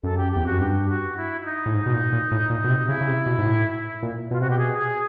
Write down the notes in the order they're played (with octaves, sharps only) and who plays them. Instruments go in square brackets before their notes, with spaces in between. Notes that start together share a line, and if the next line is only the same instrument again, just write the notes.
[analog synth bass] F#2 [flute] A4
[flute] G4
[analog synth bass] E2 [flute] G4
[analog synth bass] F2 [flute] F#4
[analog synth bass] F#2
[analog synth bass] G2 [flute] G4
[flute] F#4
E4
E4
D#4
[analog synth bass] A2
G#2
B2
A#2
A#2
A2
A#2
B2
C3
[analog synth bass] C#3 [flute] E4
[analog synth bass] C#3
C3
B2
G#2
A2
A#2
[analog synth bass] B2 [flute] F4
[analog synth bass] C3 [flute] F#4
[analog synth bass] B2 [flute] G4
[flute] G#4
G#4